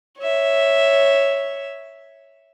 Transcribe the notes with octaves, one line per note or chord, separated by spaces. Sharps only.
C#5 E5